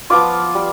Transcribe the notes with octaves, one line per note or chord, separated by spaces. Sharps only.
F3 B3 F4 D6
G3